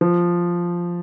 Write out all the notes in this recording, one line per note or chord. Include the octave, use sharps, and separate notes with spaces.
F3